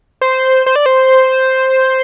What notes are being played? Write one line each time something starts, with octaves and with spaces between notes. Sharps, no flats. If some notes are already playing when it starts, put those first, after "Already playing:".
C5
C5
D5
C5